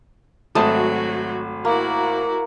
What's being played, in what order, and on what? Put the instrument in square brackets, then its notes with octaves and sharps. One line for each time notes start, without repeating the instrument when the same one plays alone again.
[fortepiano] G#1 A5 D#6 [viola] F#3 F#4 [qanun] A3
[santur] A#3 [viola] E4 F#4